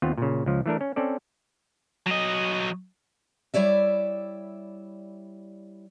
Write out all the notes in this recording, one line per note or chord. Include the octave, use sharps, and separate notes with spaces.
D#2 B3 C4 F4
A#2 C#3
C#2 F3
E3 A3 D4 A#4
C#4
C4 C#4 A4 D5
F#3 D#5
G3 E4 C#5 D5 E5